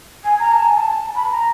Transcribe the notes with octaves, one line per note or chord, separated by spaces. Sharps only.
G#5
A#5
A5
G#5
A5
B5
A#5